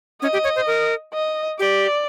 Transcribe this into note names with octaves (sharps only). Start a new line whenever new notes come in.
C#4 D#5
G4
C#5
C5
A#4
D#5
G4 D5